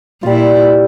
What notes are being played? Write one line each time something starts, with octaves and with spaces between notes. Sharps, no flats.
A#2 G3 E4 F4